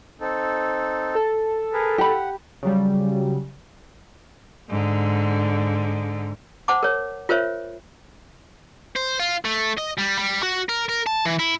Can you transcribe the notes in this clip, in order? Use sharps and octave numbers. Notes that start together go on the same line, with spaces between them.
C4 D#4 A4
A4
G#4 A#4 B4
G4 F#5 B5
C#3 F#3 G3
G#2 D3
C5 F#5 A5 D6
A#4 C#5
F4 A#4 C5 C#5 E5
C5
F4
A3
D#5
G3
G3
F#4
A#4
A#4
A5
E3
E4